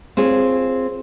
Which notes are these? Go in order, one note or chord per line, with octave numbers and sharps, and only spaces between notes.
C4 F4 G#4 C#5